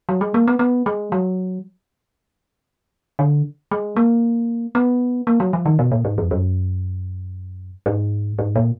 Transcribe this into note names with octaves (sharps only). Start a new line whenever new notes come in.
F#3
G#3
A#3
B3
B3
G#3
F#3
D3
G#3
A#3
B3
A#3
F#3
F3
D#3
B2
A#2
G#2
F2
F#2
G#2
G#2
A#2